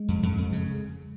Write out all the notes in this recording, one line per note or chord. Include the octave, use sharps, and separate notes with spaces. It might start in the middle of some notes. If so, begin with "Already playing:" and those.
Already playing: G#3
F2
F2
F2
C#3